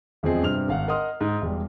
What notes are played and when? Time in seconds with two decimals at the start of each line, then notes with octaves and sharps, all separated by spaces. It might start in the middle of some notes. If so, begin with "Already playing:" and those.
0.23 E1 F2 F3 C4 G#4 D#5
0.42 G2 C3 C4 F6 F7
0.68 G#1 F5 F#5
0.88 A#4 D#5 F#5 C6 D#6 F6
1.21 G#2
1.42 E1 G3